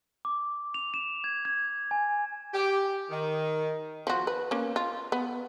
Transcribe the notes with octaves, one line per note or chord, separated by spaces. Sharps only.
D6
F7
E7
G#6
G#6
G#5
G4
D#3
F3 F#4
B4
A#3 C#4
F4
B3